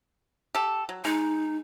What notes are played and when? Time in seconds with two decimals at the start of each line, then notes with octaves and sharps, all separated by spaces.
0.55 G4 A4
0.89 F#3
1.05 G#3 D#4